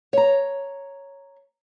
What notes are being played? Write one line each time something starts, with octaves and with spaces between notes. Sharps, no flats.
C#5 A#5